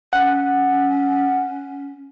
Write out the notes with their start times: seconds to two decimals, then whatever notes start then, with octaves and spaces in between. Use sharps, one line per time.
0.13 C#4 F#5